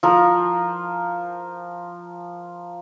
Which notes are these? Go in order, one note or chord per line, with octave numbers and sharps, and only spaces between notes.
F3 A#4